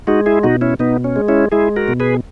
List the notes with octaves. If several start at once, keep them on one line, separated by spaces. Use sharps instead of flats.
G#3 D#4 F#4
E4 G#4
B2 D#4 F#4
C#4 E4
B2 B3 D#4
C#4
G#3
C#4 E4
G#3 E4 G#4
F#4 A#4
B2
G#4 B4